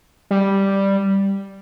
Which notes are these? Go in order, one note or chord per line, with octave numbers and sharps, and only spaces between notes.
G3